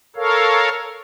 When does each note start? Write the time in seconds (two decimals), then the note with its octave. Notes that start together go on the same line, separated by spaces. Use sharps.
0.16 A4 A#4 C#5 F5